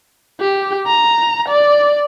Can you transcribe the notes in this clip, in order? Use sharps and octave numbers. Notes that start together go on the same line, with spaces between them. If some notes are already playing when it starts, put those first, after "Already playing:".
G4
A#5
D5